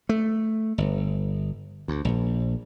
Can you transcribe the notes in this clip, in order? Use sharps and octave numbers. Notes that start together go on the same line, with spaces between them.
A3
G1
D2
A#1